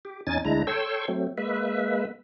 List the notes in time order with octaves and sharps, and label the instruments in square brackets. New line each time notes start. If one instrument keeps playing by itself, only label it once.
[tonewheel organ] G4
E2 C#4 D#4 G#5 A6
D2 G#3 D4 E4 A#5
A4 C#5 G5 C6 C#6 E6
F#3 A3 C4
G#3 A#3 B4 E5